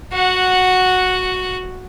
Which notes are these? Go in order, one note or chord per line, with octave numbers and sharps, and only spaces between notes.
F#4 F#5